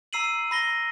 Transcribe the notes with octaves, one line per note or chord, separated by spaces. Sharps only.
A#5 E6 C7 D#7 F#7
B5 A#6 G7